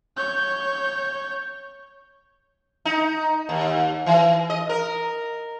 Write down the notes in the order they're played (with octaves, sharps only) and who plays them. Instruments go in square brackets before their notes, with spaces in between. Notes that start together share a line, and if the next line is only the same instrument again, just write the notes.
[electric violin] C#5 G6
[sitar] D#4
D#2
E3
D#5
A#4